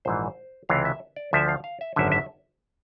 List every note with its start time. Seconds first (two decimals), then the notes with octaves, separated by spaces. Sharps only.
0.05 A#1 G#2 E3 C5
0.69 C#2 C3 E3 F5
0.85 E5
1.16 D5
1.33 D2 D3 F3 E5
1.48 F5
1.64 F5
1.81 E5
1.96 G#1 F#2 D3 E5
2.12 E5